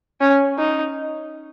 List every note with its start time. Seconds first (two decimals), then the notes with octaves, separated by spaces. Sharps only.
0.21 C#4
0.58 D#4